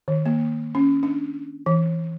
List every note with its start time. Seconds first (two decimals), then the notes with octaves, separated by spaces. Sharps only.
0.08 D#3
0.26 A#3
0.75 C#4
1.03 D4
1.66 E3